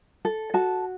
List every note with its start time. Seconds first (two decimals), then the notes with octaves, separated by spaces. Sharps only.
0.25 A4
0.54 F#4 A5